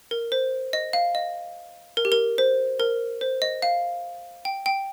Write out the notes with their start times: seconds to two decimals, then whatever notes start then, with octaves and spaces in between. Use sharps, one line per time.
0.11 A#4
0.32 C5
0.73 D#5
0.93 F5
1.15 D#5
1.97 A#4
2.05 G4
2.12 A#4
2.38 C5
2.80 A#4
3.21 C5
3.42 D#5
3.62 F5
4.45 G5
4.66 G5